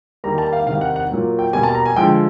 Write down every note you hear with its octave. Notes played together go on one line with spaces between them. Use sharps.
D#3 G3 A#3 A#5
A5
F5
C3 D#3 G3 F5
F#5
F#5
A#2 F#3 A#3
G5
B2 G3 A#3 G#5
A5
A#5
G#5
D3 F3 G#3 G5